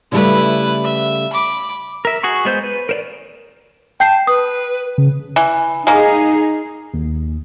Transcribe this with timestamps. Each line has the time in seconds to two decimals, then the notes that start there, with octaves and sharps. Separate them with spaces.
0.12 C#3 G3 A3 E4 B4
0.85 E5
1.33 B5 D6
2.05 A#4 E5
2.23 F#4 G#4 C#6
2.45 G#3 B3 C5 G6
2.64 B4
2.89 A#4 C5 D5
4.00 G5 A5 G6 C7
4.27 B4 D#6
4.98 C#3
5.36 E3
5.87 G#3 A#3 D#4 G#4
6.94 D#2